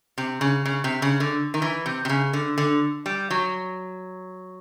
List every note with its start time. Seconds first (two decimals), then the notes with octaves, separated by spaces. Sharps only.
0.18 C3
0.41 C#3
0.65 C#3
0.84 C3
1.02 C#3
1.20 D3
1.54 D#3
1.62 E3
1.86 C3
2.05 C3
2.09 C#3
2.33 D3
2.58 D3
3.06 G3
3.30 F#3